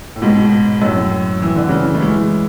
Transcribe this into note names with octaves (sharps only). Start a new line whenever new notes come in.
A2
G#2 B2
F#2 A2
E3
D3
C#3 E3
A3
E3 G#3